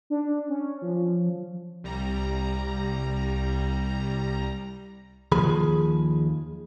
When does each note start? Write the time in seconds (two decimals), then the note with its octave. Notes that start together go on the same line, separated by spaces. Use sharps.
0.10 D4
0.49 C#4
0.82 F3
1.84 C2 G3 A#5
5.32 D#2 F3 G#4 B5